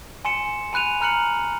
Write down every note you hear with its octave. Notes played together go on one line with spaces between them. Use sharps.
G#5 C6 C#7 E7
G#5 B5 F#6 D#7 F7
A#5 F6 F#6 C#7 F#7